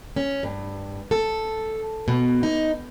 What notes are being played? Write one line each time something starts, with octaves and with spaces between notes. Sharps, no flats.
C#4
G2
A4
B2
D#4